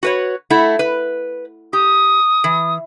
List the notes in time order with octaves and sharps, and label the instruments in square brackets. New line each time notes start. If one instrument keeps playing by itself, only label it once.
[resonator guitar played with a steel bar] F#4 B4 C#5
A3 E4 F#5
B4
[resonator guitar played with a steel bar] G4 [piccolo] D#6
[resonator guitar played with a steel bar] E3